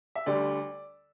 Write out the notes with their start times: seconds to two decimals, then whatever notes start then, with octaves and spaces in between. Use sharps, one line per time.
0.15 E5
0.26 D2 D3 G3 D5